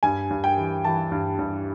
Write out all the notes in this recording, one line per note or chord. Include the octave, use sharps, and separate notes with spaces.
G2 G#5
G2
G5
E3
E3 A5
G2
G2